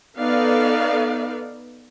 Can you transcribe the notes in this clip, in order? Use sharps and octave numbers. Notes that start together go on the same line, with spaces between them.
B3 D#4 A4 B4 D5 F5